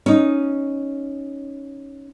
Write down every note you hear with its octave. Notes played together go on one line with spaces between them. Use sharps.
C#4 D#4